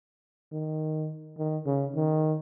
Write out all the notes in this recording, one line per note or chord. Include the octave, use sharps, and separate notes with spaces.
D#3
D#3
C#3
D#3